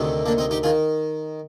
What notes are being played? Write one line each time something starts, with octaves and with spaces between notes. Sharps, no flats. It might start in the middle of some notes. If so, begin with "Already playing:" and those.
Already playing: D2 C3 D#3
A#3 D4
C4 D#4
D#4 G4
D#3 F4 G#4